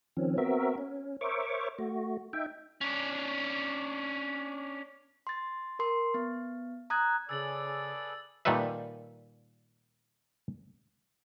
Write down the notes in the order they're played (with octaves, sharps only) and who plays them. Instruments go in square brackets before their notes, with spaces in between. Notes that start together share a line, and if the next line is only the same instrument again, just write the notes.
[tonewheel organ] D#3 F3 C4 C#4
B3 C4 F#4 A#4 E5
C#4
A#4 C5 C#5 E5 C#6 D6
A3 F#4
D#4 E5 G5
[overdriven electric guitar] C#4 D4
[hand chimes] C6 A6
A#4 C6
B3
A#5 D#6 F#6 G#6
[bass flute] C#3 [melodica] G#4 A4 B4 [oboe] D5 [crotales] E6 A6 F#7
[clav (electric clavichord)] A#2 D#3 G3 A4 B4 E5